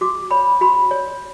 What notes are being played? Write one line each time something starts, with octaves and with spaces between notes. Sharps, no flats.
F#4 D6
C#5 B5
F#4 B5
C#5